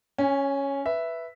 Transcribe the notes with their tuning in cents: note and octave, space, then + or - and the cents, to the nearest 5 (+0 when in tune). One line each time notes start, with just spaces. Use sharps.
C#4 +0 G#5 -30
B4 +0 E5 +0